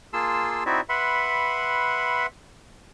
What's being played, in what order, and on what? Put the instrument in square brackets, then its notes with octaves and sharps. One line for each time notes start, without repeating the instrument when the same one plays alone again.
[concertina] A#3 F4 G#4 A5 C6 E6
C4 D#4 E4 F#4 D5 E5
B4 E5 F#5 B5 C6